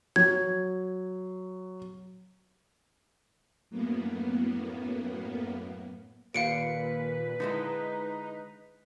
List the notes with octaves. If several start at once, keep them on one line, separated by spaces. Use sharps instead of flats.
F#3 G#6
F#2 A2 A#3 B3
D#2 A#2 B4 F5 C#7 D7
D3 G#3 D#4 E4